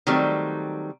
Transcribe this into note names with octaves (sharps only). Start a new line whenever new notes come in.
D#3 F#3 G3 A3 C4